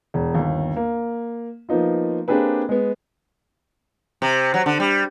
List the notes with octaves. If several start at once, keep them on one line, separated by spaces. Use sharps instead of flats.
E1
G1 D#2
A#3
F3 A#3 B3 D#4 F4
A#3 C4 D4 G4 G#4 B4
G#3 B3
C3
F#3
D3
G3